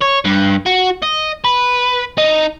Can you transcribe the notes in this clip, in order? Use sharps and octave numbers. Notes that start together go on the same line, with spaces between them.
C#5
G2
F#4
D#5
B4
D#4